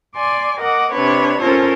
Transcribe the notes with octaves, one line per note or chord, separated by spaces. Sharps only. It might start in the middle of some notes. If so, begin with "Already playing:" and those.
D5 G#5 C6 D6
A#4 D#5 F#5 D6
C3 D4 B4 C#5
C#4 F4 A4 A#4 C5 C#5